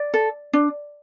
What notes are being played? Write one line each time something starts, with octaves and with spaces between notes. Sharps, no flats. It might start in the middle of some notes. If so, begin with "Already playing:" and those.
Already playing: D5
A4
D4